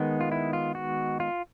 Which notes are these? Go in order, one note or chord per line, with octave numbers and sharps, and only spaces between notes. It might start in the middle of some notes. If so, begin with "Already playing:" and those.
Already playing: D#3 G#3 B3
F4
E4
F4
F#4
F4